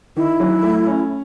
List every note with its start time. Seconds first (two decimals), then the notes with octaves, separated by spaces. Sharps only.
0.16 D#3 E4
0.40 F#3
0.62 A3
0.86 C#4